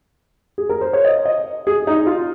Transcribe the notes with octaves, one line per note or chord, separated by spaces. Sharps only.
G#4
A#4
C5
C#5
D#5
D#5
G#4
D#4
F4